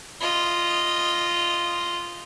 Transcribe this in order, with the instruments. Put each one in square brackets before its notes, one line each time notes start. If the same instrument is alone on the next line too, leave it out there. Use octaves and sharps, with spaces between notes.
[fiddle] F4 D#5